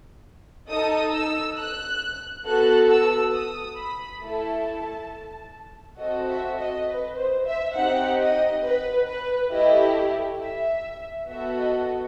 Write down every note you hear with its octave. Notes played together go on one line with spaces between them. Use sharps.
D#4 A4 D#6
E6
F#6
B3 F#4 A4 F#6
E6
D#6
B5
A3 E4 A4 A5
C4 F#4 A4 D#5
E5
D#5
B4
C5
E5
C4 D#4 G4 F#5
D#5
B4
B4
A3 E4 G4 D#5
E5
B3 F#4 A4 E5
D#5